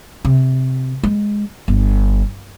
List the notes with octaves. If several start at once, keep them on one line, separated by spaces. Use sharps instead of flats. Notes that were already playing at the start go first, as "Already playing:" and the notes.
C3
G#3
G1